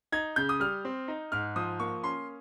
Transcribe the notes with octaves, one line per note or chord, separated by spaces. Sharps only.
D#4 G#6
C#3 G6
D#6
G3 F6
C4
D#4
G#2 F6
F3 D#6
A#3 C#6
C#4 C6